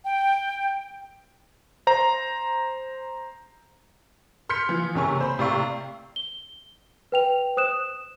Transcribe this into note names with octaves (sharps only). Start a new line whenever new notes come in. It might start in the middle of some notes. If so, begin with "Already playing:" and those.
G5
C5 A#5
C6 F6 G6 B6 C#7
E3 F3
F#1 C3 C#4 G#5 C#6
C5 B5
A2 C3 D5 F5 C#6
G7
B4 G5 F7
C5 D#6 F#6 E7